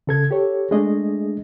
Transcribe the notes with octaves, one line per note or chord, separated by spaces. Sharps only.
C#3 A4 G#6
G4 A4 C#5
G#3 A3 D4 G#4 D#5